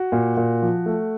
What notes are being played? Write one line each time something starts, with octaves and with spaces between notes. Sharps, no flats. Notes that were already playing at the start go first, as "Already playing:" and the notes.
Already playing: F#4
A#2
A#2
F3
A3